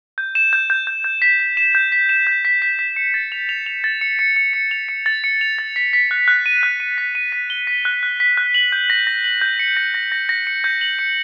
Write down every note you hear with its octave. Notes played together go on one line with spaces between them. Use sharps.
G6
E7
G6
G6
G6
G6
B6
B6
E7
G6
B6
E7
G6
B6
B6
B6
C#7
A6
F7
F7
F7
A6
C#7
C#7
C#7
C#7
F7
C#7
A6
C#7
F7
A6
B6
B6
F#6
F#6
D#7
F#6
D#7
B6
D#7
B6
G7
B6
F#6
F#6
B6
F#6
F#7
G6
A#6
A#6
F#7
G6
C#7
A#6
A#6
A#6
A#6
C#7
G6
F#7
C#7